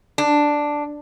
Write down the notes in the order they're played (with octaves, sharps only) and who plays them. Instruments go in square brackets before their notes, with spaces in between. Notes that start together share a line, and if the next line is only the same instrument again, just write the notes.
[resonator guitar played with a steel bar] D4